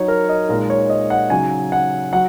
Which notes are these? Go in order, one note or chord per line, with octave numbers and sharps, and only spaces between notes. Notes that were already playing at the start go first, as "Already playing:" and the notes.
Already playing: F#3 D#4 C#5
A#4
D#5
A#2 G#3 D#4 A#4
C#5
D#5
F#5
C#3 F#3 D#4 G#5
F#5
F#3 F#5